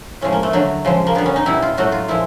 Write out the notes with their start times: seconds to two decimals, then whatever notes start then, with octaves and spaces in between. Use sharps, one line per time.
0.21 A2 F3 G#3 C#4
0.33 A#3
0.43 A3
0.53 D3 F#3 A3
0.85 C#3 F3 G#3
1.07 A#3
1.15 D3 G3 B3
1.26 C#4
1.36 D#4
1.46 B2 G3 E4
1.62 F4
1.77 A2 F#3 A3 F#4
1.92 F4
2.08 A#2 F3 G#3 E4